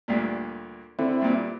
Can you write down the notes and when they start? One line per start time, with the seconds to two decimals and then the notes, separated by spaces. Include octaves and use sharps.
0.08 D2 G2 A#2
0.99 D3 C4 E4
1.22 G2 A#2